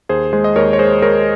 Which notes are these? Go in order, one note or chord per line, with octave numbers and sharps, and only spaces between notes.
D#2 G#4 C5
G#3 G#4 C5
D#5
D#2 A#4 C#5
C#5
G#3 G#4 C5
G#3 A#4 C#5